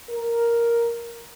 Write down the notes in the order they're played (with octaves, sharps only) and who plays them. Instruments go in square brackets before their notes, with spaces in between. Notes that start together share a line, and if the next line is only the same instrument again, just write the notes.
[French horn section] A#4